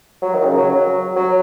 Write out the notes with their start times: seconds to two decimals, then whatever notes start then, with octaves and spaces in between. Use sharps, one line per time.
0.22 F#3
0.34 D#3
0.45 C#3
0.57 F#3
0.69 F#3
1.16 F#3